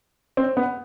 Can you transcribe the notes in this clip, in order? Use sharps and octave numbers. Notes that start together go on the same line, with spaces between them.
C4
B3